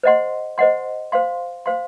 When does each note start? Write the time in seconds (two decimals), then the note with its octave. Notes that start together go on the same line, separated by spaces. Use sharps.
0.03 C5 D#5 F#5 C6
0.58 C5 D#5 F#5 C6
1.12 C5 F5 C6
1.66 C5 F5 C6